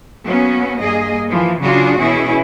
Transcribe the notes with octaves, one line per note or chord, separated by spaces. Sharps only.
F#3 A#3 B3 C#4
G2 A#3 G#4 D#5
E3 F3 A#3
C#3 F#3 D4 F4 F#4 G#4
B2 E3 C#4 E4 G#4